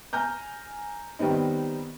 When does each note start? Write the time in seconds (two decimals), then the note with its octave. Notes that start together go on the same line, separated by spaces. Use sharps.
0.13 G#5 A#5 F6 G6
1.19 D#3 G3 B3 C4 D#4